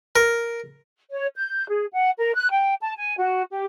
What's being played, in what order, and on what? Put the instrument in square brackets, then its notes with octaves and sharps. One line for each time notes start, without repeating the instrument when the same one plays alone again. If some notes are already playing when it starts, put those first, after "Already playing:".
[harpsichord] A#4
[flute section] C#5
G6
G#4
F#5
A#4
F#6
G5
A5
G#5
F#4
G4